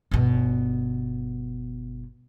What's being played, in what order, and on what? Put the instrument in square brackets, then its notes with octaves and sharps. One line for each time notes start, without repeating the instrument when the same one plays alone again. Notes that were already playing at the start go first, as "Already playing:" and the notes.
[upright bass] G1 B2